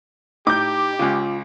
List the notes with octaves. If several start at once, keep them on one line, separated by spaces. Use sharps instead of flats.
A2 D#4 G4 D6 G6
C#2 C#3 F4